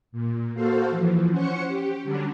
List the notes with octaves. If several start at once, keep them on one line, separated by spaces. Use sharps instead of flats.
A#2
A#3 F#4 A4 C5 F5
E3 F3
C#4 C5 F#5 C#6 C#7
G4
D3 F#3 G3 C#4 D4